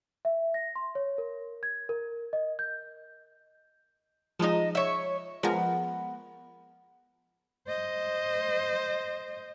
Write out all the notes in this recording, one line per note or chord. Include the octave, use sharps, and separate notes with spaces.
E5
A#6
C6
C#5
A#4
G#6
A#4
D#5
G6
F3 G#3 D#4 D#5 A5
C#5 E5
F3 G#3 B3 A#4
C5 D#5